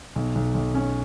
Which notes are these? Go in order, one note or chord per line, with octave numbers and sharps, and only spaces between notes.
B1
B1
B1
C#4